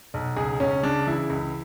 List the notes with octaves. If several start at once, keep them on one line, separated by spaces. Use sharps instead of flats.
B1
C#2 G#4
C#2 C#4
C#3 D4
E3 E4
C#2